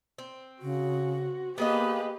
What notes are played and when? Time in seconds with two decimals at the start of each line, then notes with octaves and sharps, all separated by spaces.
0.18 C4
0.62 C#3 F#4
1.58 A#3 B3 G4 G#4 B4 D#5